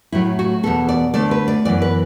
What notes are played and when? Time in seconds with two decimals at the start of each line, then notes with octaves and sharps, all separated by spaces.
0.12 A2 F#3 A3 E4
0.39 F#4
0.63 E2 B2 B3 A4
0.89 D5
1.14 D2 D3 A3 D5
1.31 B4
1.48 D5
1.65 F#2 E3 B3 D5
1.82 B4